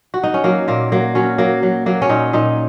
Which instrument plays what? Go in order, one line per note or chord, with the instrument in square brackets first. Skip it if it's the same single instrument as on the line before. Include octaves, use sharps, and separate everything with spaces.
[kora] F#4
D#4
C#4
F#3 A#3
A#2 A#3
F#3 A#3
F#3 C#4
F#3 A#3
F#3
F#3 A#3
C#4
A#2 D#4
A#2 D#4